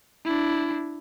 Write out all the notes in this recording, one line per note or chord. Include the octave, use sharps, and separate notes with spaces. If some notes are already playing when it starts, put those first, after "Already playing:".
D4 E4